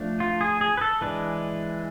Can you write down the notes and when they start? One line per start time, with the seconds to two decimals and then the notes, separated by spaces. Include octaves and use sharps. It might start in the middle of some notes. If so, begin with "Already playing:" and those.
Already playing: F3 A3 D4
0.20 F4
0.41 G#4
0.61 G#4
0.77 B4
0.81 A4
1.01 E3 G#3 D4 B4